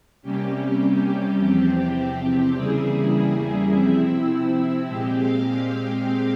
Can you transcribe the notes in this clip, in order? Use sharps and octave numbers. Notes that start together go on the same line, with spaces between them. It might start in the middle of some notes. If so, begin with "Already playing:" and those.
C3 G3 A#3 C#4 G4
E2 C3 F3 C4 G4
E2 C#3 G3 A#3 E4 G#4
C3 F3 C4 E4 E5
A#2 G#3 C4 G4
F5